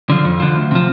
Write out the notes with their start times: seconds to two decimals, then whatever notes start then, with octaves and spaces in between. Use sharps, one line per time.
0.10 D3 F3
0.25 F2
0.40 D3 F3
0.56 D2
0.71 C3 F3